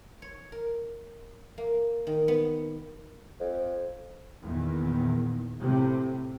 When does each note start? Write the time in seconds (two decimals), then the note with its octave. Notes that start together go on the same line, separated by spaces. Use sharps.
0.22 C#5
0.52 A#4
1.58 A#3
2.07 D#3
2.28 B3
3.40 F2
4.43 E2 A#2 D#3
5.60 A2 C3